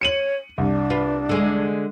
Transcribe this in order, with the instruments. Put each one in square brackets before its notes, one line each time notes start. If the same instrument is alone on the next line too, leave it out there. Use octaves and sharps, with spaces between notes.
[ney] C#5 [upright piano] C#7 D#7 F#7
[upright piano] C2 [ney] D4
[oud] F4 B4
D3 G#3